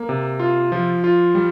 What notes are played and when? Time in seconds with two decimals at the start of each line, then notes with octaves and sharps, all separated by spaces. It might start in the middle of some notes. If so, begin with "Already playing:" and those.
Already playing: A#3
0.09 C3
0.40 F4
0.72 F3
1.04 F4
1.35 G3